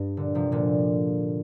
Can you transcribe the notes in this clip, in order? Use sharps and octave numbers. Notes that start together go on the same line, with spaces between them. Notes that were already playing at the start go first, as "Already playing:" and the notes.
Already playing: G2
A#2 D3
C3 F3
A#2 D3